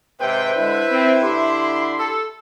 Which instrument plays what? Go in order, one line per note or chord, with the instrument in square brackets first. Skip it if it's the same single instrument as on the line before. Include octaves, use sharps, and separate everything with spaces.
[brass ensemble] G#2 C3 G5 [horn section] B4 C5 E5
[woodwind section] D3 G#3 [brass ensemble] E4
[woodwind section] C4
D3 G4 C6
[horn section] A4